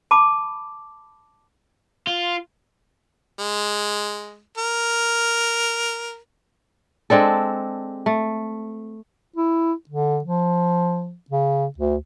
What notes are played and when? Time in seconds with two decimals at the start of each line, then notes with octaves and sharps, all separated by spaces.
0.11 A5 B5 D6
2.07 F4
3.39 G#3
4.58 A#4
7.10 G#3 C4 D4 A4
8.06 A3
9.36 E4
9.90 D3
10.24 F3
11.30 C#3
11.78 D2